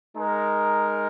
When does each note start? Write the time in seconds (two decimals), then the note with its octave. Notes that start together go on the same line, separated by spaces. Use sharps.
0.16 G#3 D#4 A#4